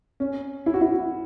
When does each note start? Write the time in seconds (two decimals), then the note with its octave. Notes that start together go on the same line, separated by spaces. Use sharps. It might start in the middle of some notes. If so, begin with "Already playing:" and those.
0.20 C#4
0.66 E4
0.74 F#4
0.81 E4